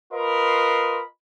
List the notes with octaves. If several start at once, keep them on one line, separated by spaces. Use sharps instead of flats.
F4 A#4 B4 D#5 B5 C6